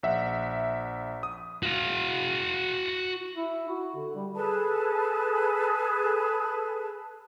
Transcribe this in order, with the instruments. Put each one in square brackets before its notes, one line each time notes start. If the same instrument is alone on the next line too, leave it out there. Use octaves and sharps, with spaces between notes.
[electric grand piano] A#1 E5 F#5
D#6
[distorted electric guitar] F#4 F5
[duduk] E4
F#4
D3
G3
[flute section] G#4 A4 B4 A5